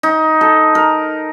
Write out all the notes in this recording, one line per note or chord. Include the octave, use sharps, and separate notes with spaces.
D#4
A4
A#4